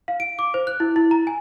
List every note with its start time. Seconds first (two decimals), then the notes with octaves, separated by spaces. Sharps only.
0.08 F5
0.20 D7
0.39 D6
0.54 C5
0.67 F#6
0.80 E4
0.96 E4
1.11 A#5
1.27 G#5